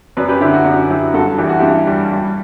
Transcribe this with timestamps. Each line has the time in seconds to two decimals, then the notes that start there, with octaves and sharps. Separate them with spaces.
0.17 F#2 B4 D5
0.29 G4 B4
0.40 D3 E4 G4
0.53 F#4
0.65 F#2 F#4
0.90 F#3 E4 G4
1.14 G2 F#4 A4
1.38 E3 G4
1.49 F#4
1.60 G2 E4 G4
1.87 G3
2.12 G3